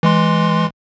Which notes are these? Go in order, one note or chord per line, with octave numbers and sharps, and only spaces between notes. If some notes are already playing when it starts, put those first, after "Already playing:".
E3 G#3 C6